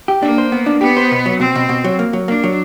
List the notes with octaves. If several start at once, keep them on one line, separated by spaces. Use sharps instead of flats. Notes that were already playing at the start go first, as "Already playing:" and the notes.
G4
A#3 D4
C5
B3
D4
B3 G4
C5
B2
F#3
B2 C4
B2
B2
F#3
A#3
F#3
A#3 D4
F#3